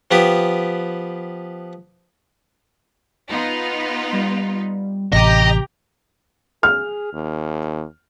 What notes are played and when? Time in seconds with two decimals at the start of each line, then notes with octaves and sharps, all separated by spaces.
0.11 F3 B3 G4 B4
3.29 B3 D#4 F4
4.13 G3
5.13 A1 C3 G4 D#5 G5 A#5
6.63 G#4 F6
7.13 D#2